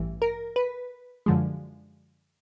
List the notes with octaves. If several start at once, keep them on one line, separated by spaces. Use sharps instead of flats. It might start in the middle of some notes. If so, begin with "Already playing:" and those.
Already playing: A1 G2 E3
A#4
B4
F#2 D3 F3 G#3